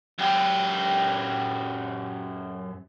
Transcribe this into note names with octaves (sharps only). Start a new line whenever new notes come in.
F#2 G4